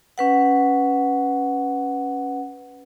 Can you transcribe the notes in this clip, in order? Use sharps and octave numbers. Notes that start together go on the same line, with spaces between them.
C#4 B4 F#5